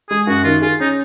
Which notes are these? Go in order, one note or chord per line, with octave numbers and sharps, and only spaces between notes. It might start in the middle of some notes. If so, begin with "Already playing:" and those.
G#3 G#4
F#2 F#4
D#3 F4
F4 G#4
C#4 D#4